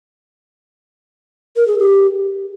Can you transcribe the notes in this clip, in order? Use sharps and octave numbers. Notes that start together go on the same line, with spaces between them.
A#4
G#4
G4